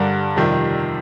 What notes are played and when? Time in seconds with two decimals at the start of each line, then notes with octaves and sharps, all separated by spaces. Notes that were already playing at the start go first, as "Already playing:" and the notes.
Already playing: G2 D3 G3 A#4
0.36 F2 C3 D#3 G3